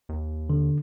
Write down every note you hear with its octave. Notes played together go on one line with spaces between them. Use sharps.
D#2
D3